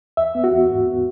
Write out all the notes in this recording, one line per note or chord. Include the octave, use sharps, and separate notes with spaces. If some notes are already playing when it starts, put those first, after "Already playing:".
E2 E5
B3
F#4
E2
G#2
B3